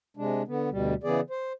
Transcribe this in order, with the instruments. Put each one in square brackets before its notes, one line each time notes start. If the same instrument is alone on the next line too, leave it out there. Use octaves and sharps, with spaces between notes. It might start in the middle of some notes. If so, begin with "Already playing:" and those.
[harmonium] C3 G#3 D4
D3 B3
D2 B2 G3
C#3 E3 B3 G#4 D5
C5